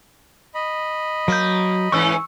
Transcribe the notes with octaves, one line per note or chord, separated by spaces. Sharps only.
D#5 B5
F#3 A#3 G6
G#2 E3 C#4 C#6 E6